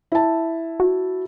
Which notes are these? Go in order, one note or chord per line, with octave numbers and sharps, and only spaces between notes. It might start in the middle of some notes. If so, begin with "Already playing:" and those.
E4 A5
F#4